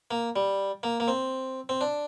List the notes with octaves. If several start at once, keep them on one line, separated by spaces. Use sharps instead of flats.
A#3
G3
A#3
A#3
C4
C4
D4